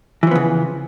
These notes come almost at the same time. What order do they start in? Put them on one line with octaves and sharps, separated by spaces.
E3 F3 B3 C#3